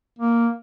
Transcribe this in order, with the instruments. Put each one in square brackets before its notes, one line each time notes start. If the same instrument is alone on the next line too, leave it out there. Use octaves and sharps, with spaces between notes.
[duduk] A#3